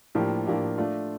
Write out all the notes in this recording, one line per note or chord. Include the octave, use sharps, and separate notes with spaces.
A2 F3 A#3 D4 G4
A2 F3 A#3 D4 G4
A3 D4 F4